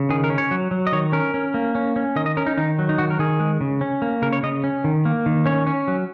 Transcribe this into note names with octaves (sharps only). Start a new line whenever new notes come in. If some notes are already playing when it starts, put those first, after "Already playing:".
Already playing: C#3
D#3 G#4
A#4
C#4
C#5
F#3
F#3
D#5
D#3 C#5
C#4 A#4
C#4
A#3
C#4
C#4
D#3 D#5
D#5
C#4 A#4
D#4
D#3 D#4
F#3
D#4
D#3 F#4
A#4
D#3 G#4
G#3
C#3
C#4
A#3
C#3 A#4
C#5
C#3 D#5
C#4
D#3
A#3
D#3
C#4 C#5
C#4
F#3